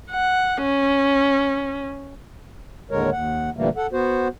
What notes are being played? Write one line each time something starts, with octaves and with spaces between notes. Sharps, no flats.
F#5
C#4
D#2 A2 D3 G#3 A#4 C#5
D#2 F#5
A#2 D3 E3 G3 A3 A#3
A4 F#5
B3 F#4 C5